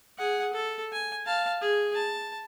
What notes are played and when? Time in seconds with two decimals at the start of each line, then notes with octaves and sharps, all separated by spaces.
0.18 G#4 F#5
0.53 A4
0.92 G#5
1.26 F5 A5
1.61 G#4
1.95 A5